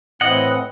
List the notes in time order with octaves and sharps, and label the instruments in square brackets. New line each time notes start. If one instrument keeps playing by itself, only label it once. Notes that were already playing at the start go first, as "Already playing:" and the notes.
[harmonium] A2 E3 C4 E4 [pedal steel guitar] D#5 F#5